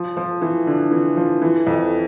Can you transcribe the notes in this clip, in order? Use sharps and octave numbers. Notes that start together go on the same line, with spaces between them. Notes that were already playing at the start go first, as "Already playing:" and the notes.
Already playing: F3
F3
E3
D3
E3
F3
E3
F2